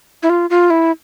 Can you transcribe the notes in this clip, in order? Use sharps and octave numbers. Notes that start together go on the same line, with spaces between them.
E4
F4
F4
E4